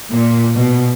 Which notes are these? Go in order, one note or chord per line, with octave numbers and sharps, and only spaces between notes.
A#2
B2